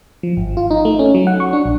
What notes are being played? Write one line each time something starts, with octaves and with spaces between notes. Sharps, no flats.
F3
G#1
F4
D#4
A3
C#4
F#3
F#5
C#6
D4
A#1